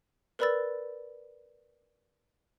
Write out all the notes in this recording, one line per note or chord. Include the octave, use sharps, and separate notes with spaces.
A#4 B4 D5 B5 E6 A6